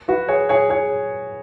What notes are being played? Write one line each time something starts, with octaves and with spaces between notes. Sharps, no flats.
F#4 B4
G#4 C#5
G#4 C#5
G#4 C#5